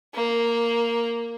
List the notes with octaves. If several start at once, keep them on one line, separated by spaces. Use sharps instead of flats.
A#3